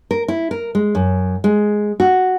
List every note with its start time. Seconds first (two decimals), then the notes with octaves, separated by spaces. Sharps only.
0.11 A#4
0.28 E4
0.51 A#4
0.75 G#3
0.95 F#2
1.44 G#3
2.00 F#4